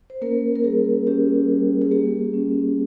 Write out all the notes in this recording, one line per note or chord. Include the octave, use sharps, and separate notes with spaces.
C5
A#3 C#4 A#4
A#4
G3 G#4
C#4 G4
G3
G#4
A#3 G4
C#4